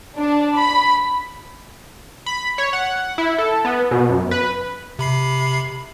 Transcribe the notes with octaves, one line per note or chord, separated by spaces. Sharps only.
D4
B5
B5
C#5
F#5
E4
A4
B3
B2
F#2
B4
C3 B5 C7